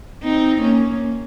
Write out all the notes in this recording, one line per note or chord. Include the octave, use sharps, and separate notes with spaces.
C4 D#4
A#3 C#4